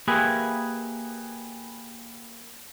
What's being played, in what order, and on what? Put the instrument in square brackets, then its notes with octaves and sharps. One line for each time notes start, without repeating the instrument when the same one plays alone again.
[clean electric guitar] A#3 G4 G#4 B4 E5 G#5